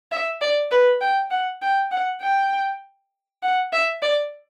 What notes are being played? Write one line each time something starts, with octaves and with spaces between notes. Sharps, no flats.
E5
D5
B4
G5
F#5
G5
F#5
G5
F#5
E5
D5